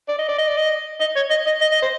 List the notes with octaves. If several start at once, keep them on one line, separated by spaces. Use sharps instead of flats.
D5
D#5
D5
D#5
D5
D#5
D#5
C#5
D#5
D#5
D#5
D#5
C5